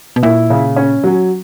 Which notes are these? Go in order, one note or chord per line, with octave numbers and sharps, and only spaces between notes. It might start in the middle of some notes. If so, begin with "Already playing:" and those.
B2
A#2 E4
C#3
C#4
F#3